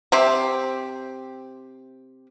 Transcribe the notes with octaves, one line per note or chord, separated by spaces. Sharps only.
C3 C4 G4